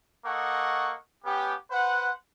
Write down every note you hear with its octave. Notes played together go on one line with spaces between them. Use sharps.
A#3 A4 D#5 F#5 C#6
B3 C#4 G4
B4 C5 F#5